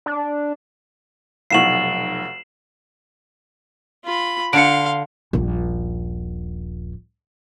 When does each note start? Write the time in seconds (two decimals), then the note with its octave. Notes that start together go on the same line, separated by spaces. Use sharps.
0.06 D4
1.51 F1 B1 F5 F#5 C#6 C7 E7 F#7
4.05 F4 B5
4.53 D3 F5 C6 C#7 D7
5.33 D#1 A#1